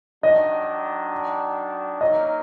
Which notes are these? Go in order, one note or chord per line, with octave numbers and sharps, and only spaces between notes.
D#3 F#3 D4 D#5
F#3 A#3 D#4 A#4 D#5